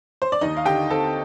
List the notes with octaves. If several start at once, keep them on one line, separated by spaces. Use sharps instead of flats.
C5
D5
D#2 D#4 D#5
F5
D3 G4 G5
C4 A4 A5